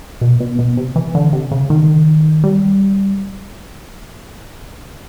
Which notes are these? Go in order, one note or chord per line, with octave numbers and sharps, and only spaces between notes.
B2
B2
B2
C3
E3
D3
C3
C#3
D#3
G3